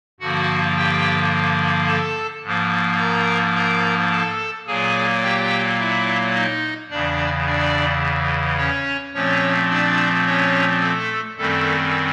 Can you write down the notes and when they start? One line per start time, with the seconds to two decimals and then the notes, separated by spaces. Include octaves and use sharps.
0.20 G2 D3 F3 A#3 F#4 F#5
0.76 G4 G5
1.88 A4 A5
2.44 G#2 F3 A#3
2.99 A#4 A#5
3.55 A#4 A#5
4.11 A4 A5
4.67 A#2 F#3 A#3 G#4 G#5
5.23 G4 G5
5.79 E4 E5
6.35 D#4 D#5
6.90 E2 C#3 E3 D4 D5
7.46 D4 D5
8.58 C#4 C#5
9.14 A#2 F3 A3 C4 C#4 C#5
9.70 D4 D5
10.26 C#4 C#5
10.81 A3 A4
11.37 F#2 D#3 G3 A3 C4 A4